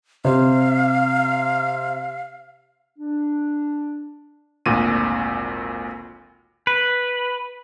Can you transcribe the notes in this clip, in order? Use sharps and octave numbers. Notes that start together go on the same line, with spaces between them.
C3 C5 F5
D4
G#1 D2 A#2 D#7
B4